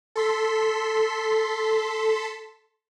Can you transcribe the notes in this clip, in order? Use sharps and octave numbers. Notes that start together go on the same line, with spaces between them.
A4 C6 B6